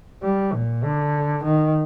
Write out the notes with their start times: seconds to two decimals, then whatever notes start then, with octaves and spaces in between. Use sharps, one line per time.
0.23 G3
0.53 A#2
0.84 D3
1.44 D#3